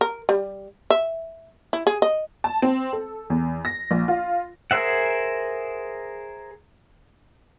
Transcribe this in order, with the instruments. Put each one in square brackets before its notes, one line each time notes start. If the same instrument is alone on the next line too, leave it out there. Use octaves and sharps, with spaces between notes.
[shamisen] A#4
G3
E5
E4
G#4
D#5
[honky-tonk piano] A5
C4
A4
E2
A#6
A#1
F4
[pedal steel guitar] G#4 A#4 C5 E5 F#5